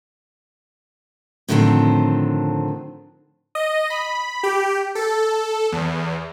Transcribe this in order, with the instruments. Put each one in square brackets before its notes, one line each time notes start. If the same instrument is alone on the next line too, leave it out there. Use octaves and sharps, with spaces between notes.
[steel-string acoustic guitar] A2 D3 D#3 F3 C4
[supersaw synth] D#5
B5
G4
A4
E2